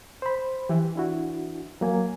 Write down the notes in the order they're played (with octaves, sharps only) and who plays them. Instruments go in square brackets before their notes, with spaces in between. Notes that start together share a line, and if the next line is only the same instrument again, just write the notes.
[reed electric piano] C5 B5
[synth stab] E3 [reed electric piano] G4
[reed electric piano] D4 E4 F#4
F#3 A#3 G#5